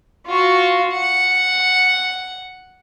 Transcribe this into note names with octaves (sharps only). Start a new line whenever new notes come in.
F4 F#4
F#5